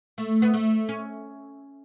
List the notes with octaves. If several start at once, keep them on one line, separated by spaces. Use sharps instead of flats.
A3
B3
A3
C#4